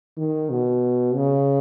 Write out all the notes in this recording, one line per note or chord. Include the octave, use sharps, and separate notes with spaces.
D#3
B2
C#3